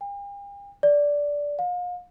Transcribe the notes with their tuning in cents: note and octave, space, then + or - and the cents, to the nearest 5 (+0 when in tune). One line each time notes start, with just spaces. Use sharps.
G5 +45
D5 -10
F5 +40